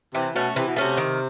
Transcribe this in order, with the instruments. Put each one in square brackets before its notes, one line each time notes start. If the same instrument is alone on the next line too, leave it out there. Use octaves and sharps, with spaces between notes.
[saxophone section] C3 [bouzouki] E3
[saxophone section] B2 [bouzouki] A3 C#4 F#4
[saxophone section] C3 [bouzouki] E3
[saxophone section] B2
[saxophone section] C3 [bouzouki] A3 C#4 F#4
[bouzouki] D#3